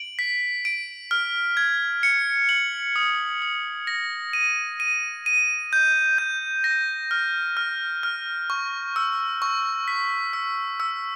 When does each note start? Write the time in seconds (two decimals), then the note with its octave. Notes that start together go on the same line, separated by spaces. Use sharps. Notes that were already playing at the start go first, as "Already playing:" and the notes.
Already playing: D7 F#7
0.19 B6
0.65 D7
1.11 F6
1.57 G#6
2.03 C#7
2.49 F#7
2.96 D#6
3.42 D#6
3.87 A#6
4.33 D#7
4.80 D#7
5.26 D#7
5.73 G6
6.18 G6
6.64 A#6
7.11 F6
7.57 F6
8.03 F6
8.50 C#6
8.96 E6
9.42 C#6
9.88 B6
10.33 E6
10.80 E6